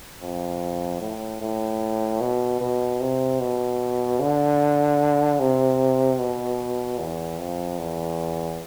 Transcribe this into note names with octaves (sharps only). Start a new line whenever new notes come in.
F2
A2
A2
B2
B2
C3
B2
D3
C3
B2
E2
F2
E2